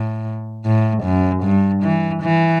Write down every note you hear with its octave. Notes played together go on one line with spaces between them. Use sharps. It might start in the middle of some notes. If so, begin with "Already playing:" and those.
Already playing: A2
A2
F#2
G2
E3
E3